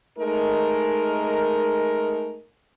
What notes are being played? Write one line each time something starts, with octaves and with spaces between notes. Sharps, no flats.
G#3 A3 D#4 A#4